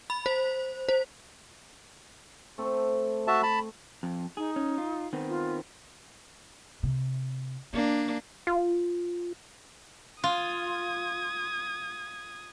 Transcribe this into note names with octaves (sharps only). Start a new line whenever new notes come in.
B5
C5
C5
A3 C4 A4
F#4 E5 A5
A5 B5
F2
D#4 G#4
C#4
F4
D#3 B3 C4
F4
C3
A#3 B3 D4
F4
F4 D#6 G#6